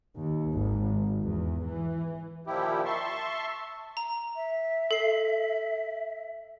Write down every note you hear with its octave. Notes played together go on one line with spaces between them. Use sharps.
D#2
G#1
E2
E3
A#2 D#3 F3 E4 G4
E5 A5 C6 C#6
A#5
E5
A4 C7